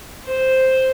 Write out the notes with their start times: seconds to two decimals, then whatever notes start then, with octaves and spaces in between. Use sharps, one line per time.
0.25 C5